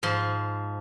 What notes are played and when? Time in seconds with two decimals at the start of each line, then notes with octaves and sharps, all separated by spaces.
0.03 G#2 F3 C6